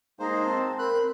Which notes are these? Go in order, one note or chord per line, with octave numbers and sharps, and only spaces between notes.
G#3 A#3 D#4 G#4 C5 A#5
C4 A5
A#4 B5 C6 F#6